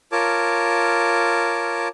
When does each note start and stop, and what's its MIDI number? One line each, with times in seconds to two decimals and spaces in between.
0.12 1.88 65
0.12 1.88 70
0.12 1.88 73
0.12 1.88 81
0.12 1.88 86